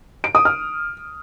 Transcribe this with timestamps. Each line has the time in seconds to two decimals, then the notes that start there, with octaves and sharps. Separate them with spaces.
0.24 D7
0.35 D#6
0.45 F6